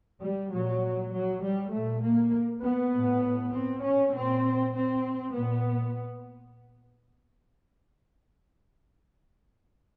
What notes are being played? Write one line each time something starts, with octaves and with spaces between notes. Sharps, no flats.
G3
A#2 F#3
F#3
G3
A#2 A3
A#3
B3
A2
C4
C#4
A#2 C4
C4
A#2 B3